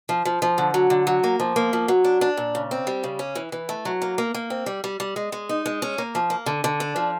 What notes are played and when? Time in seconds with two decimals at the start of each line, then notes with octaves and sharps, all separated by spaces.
0.09 F3
0.25 F3
0.42 F3
0.58 D3
0.74 F#3
0.90 D3
1.07 F#3
1.24 A#3
1.40 F3
1.56 A#3
1.73 F3
1.88 F#3
2.04 D4
2.21 D4
2.37 A#2
2.55 C#3
2.71 C4
2.87 G3
3.04 C#3
3.19 C#4
3.35 E3
3.52 E3
3.69 A3
3.85 F#3
4.02 A#3
4.18 A#3
4.34 A#3
4.50 C4
4.66 G3
4.84 G3
5.00 G3
5.16 G#3
5.32 G#3
5.49 D#4
5.66 G#3
5.82 C#4
5.98 A#3
6.15 F3
6.30 A#3
6.46 D3
6.64 D3
6.80 D4
6.96 F3